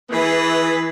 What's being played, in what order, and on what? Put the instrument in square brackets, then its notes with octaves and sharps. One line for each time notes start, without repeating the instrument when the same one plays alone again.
[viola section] E3 [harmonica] G#4 B4